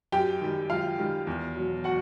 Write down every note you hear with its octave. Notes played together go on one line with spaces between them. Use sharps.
F#2 G4 G5
D#3 G3
F#2 F4 F5
D#3 G3
E2
B2 F#3
F#4 F#5